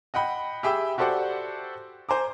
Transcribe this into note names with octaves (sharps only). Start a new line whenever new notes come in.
D#5 F#5 G5 B5
G4 G#4 E5 G5 B5 E6
F#4 G4 A4 C5 D5 F#5
C5 G#5 A#5 D6